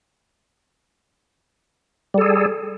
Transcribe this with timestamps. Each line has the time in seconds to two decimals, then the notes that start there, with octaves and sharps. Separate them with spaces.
2.14 G3
2.18 A4
2.21 G#4